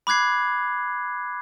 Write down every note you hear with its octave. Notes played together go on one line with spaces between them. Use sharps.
B5 D6 F#6 G#6 C7